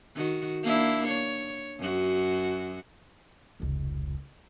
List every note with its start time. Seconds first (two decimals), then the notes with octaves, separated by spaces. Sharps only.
0.15 D#3 F#4
0.63 A#3 D4 E4
1.08 C#5
1.79 F#2 F#4
3.60 F1 C#2